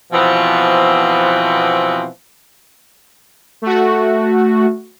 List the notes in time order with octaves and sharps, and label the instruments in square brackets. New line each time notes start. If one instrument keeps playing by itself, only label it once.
[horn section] B2 E3 F3 B3 C4
[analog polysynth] A3 F#4